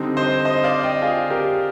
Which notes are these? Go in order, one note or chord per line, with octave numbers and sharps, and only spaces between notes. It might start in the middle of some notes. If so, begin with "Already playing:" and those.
Already playing: D3 G3 C4 D#4
C5 D#5
C5 D#5
D5 F5
D#5 G5
F4 G#4
G4 A#4